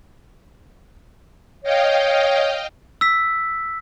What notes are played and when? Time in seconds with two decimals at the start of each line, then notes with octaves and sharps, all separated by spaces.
1.63 C#5 D#5 F5 G5
3.01 E6 B6